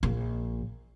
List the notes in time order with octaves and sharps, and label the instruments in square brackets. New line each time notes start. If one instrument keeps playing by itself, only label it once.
[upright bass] A#1 A#2